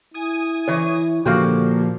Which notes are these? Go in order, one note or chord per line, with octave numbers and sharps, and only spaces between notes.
E4 G#5 D#6
E3 C#5
A#2 D3 F3 A#3 F#4 G4